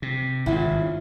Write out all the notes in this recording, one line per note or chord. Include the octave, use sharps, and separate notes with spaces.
C3
G#1 G2 C#3 E4 F4